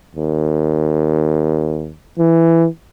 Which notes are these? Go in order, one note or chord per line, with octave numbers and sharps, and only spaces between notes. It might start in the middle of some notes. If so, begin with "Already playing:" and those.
D#2
E3